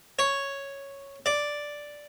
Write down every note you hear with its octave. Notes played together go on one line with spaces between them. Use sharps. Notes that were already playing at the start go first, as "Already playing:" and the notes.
C#5
D5